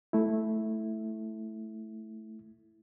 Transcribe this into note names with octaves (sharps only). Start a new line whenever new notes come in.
A3 E4